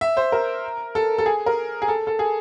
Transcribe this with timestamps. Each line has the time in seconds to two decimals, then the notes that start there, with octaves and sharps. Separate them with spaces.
0.01 E5
0.17 C5
0.32 A#4
0.95 A4
1.18 A4
1.26 G#4
1.46 A#4
1.82 G#4
1.88 A4
2.07 A4
2.19 G#4